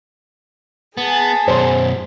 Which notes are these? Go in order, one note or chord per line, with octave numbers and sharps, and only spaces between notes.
B3 G#4 A5
F#2 B2 C5 C6